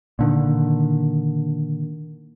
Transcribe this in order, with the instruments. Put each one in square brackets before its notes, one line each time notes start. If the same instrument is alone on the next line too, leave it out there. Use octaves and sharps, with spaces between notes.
[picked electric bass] A#2 D3 D#3